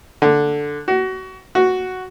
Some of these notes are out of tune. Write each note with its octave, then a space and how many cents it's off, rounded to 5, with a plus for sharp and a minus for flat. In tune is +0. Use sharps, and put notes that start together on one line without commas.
D3 +0
F#4 +25
F#4 +0